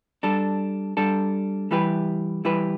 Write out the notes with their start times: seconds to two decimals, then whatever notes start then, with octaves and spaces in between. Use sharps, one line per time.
0.23 G3 D4 A4
0.97 G3 D4 A4
1.71 E3 G3 E4 G4 B4
2.45 E3 G3 E4 G4 B4